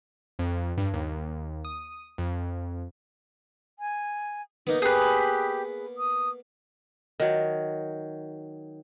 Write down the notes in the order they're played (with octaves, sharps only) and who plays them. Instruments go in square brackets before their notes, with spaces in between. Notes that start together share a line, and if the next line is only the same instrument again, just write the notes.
[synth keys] F2
G2
D#2
D#6
F2
[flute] G#5
[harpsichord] A#3 B3 [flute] D#4
[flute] G4 [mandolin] G#4 B4
[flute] D#6
[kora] D#3 F#3